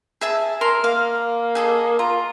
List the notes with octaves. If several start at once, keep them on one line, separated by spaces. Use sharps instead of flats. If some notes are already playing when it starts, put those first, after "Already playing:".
G#4 E5 A5
A#4 C6
A#3 F5
G#4 A4 D#5
F4 A#5